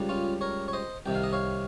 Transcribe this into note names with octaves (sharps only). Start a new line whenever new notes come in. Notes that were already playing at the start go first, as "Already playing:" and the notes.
Already playing: C#2 C#3 G3
C#4 F4
A#4 C#5
C#5
C5 D#5
C2 C3 D#3 G5
F5
D#5
C#5 F5